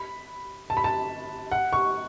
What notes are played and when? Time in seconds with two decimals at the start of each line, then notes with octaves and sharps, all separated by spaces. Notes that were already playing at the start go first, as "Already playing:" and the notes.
Already playing: B5
0.70 A5
0.77 B5
0.84 A5
1.51 F#5
1.73 C#6